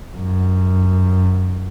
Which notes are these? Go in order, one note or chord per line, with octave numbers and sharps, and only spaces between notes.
F#2